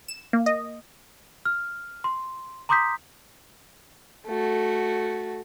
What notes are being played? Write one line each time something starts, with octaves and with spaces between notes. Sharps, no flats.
E7
A#3
D#5
F6
C6
A#5 C6 D6 D#6 G6 B6
A3 F#4